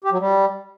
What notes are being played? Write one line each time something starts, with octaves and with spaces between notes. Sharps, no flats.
G4
F#3
G3